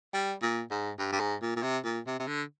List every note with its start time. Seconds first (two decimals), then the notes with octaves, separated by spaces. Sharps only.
0.14 G3
0.42 A#2
0.71 G#2
0.99 G2
1.12 G2
1.20 G#2
1.42 A#2
1.56 A#2
1.63 C3
1.84 A#2
2.07 C3
2.20 C3
2.27 D3